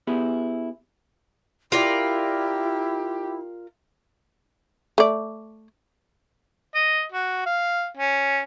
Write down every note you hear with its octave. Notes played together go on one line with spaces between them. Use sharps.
B3 E4 G4 G#4
E4 F4 G4 A#4 D5
A3 D5
D#5
F#4
F5
C#4